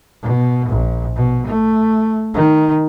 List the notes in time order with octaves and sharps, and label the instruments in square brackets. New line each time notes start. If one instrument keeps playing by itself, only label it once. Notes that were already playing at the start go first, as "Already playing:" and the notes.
[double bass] B2
A#1
B2
A3
D#3